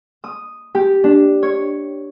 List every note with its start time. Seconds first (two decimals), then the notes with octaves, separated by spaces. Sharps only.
0.24 D#6
0.75 G4
1.04 D4
1.43 C#5